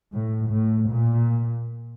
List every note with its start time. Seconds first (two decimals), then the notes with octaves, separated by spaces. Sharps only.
0.14 A2
0.52 A2
0.90 A#2